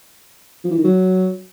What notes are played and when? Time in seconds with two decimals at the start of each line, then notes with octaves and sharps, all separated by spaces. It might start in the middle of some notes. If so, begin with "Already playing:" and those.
0.64 F3
0.71 E3
0.77 D#3
0.84 F#3